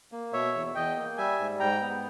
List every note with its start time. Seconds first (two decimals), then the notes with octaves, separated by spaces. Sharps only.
0.12 A#3
0.33 B2 C#5 E5
0.54 E2
0.75 E2 D#5 G5
0.97 A#3
1.17 G3 E5 G#5
1.39 G#2
1.59 G#2 G5 A#5
1.81 B3